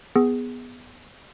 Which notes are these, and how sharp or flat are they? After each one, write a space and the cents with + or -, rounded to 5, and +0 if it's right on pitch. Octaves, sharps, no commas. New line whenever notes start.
B3 +0 G#4 -10